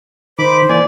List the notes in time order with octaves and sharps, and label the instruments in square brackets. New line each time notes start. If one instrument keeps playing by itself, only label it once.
[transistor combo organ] D#3 [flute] C5 [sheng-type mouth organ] B5 D6
[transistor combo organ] E3 A#3 G#5 [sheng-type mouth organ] D5